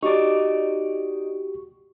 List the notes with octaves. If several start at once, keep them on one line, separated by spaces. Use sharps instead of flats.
D#4 F#4 G4 D5 C#6